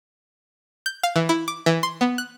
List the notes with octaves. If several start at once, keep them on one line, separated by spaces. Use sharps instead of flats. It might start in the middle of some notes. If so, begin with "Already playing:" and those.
G6
F5
E3
E4
D6
E3
C6
B3
F#6